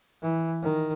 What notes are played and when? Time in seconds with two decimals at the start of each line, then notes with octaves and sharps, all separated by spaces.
0.22 E3
0.63 D#3